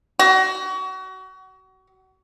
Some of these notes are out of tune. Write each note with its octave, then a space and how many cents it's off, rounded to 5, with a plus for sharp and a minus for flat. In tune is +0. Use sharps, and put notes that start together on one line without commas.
F#4 +30